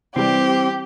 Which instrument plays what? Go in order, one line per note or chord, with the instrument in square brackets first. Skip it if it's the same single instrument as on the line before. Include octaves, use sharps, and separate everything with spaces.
[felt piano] E3 G3 [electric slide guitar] C4 [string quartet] G4